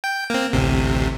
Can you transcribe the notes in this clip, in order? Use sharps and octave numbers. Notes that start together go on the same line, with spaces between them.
G5
A#3 C4
A1 D2 C3